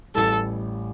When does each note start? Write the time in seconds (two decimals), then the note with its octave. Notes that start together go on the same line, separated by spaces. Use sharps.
0.15 A1 A2 G3 A4